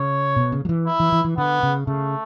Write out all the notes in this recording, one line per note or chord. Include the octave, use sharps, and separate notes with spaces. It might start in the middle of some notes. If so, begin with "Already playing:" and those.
Already playing: C#3 C#5
B2
C#3
F#3
E3
E4
E3
E3
E3
D3 B3
C#3
C#3 A3